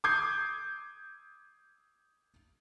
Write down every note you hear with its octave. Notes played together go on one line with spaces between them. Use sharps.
D6 D#6 G6 G#6 C7